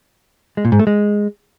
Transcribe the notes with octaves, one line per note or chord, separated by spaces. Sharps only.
G#3
A#2
G#2
A3
G#3